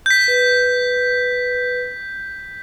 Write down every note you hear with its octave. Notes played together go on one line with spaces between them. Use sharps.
G6 B6
B4